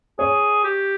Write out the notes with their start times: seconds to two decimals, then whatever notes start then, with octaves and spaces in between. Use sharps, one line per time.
0.19 G#4 C#5
0.64 G4